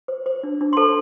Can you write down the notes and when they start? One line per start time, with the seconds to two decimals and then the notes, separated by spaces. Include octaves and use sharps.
0.08 C5
0.26 C5
0.43 D4
0.61 D4
0.73 C6
0.77 A4 C5 A5